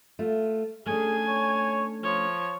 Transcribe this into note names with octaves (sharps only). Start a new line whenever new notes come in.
A3 F4
A3 C#4 D4 G#4 G#5
C#5
F3 C#5